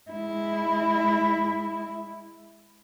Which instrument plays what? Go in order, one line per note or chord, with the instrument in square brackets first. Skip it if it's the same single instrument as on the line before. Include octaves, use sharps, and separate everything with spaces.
[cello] G#3 E4